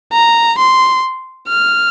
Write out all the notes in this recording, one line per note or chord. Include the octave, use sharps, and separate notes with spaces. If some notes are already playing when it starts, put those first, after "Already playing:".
A#5
C6
F6